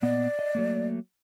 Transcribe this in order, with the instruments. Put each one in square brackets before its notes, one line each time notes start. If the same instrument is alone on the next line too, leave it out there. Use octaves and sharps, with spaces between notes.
[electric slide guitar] A#2 B3 D#5 [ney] D5
[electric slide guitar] D#5
F#3 A3 A#3